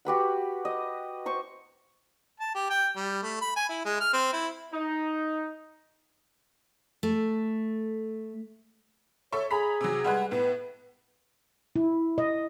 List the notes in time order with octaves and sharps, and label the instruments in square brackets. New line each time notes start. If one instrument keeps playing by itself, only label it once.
[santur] F#4 G4 B4 F#5
D#5
C5 C#6
[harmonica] A5
G4
G5
G3
A3
B5
G#5
E4
G#3
F6
C4
E4
[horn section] D#4
[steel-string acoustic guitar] A3
[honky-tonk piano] A4 E5 C#6 [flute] C#5
[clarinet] G#4 [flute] G#5 [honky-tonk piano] A#5 B5 B6
[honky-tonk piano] C3 F#3
[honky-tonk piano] G3 G#3 B4 [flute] F#5
[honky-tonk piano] A2 B3 [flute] B4
[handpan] E4
D#5